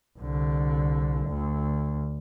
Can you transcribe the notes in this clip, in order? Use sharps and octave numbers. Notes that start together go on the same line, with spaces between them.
C2 D3
D2